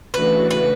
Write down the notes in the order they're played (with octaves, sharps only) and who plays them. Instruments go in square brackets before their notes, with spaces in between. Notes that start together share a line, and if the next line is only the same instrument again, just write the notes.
[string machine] C#3 E3 A3 D4 F#4 [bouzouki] B4
[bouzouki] B4